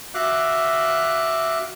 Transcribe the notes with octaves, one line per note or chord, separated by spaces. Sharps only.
F#4 E5 F5 D6 F#6